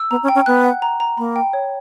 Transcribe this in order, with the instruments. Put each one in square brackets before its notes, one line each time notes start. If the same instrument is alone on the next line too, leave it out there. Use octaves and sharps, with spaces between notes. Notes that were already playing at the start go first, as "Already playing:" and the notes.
Already playing: [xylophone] E6
[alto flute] B3 [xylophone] A#5
[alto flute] C#4
[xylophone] G5
[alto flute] C#4
[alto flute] B3 [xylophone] F#6
[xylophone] F#5
A#5
A#5
[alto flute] A#3 [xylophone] B5
[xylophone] G5
C#5